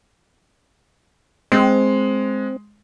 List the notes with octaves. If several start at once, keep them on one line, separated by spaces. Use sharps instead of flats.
G#3 C4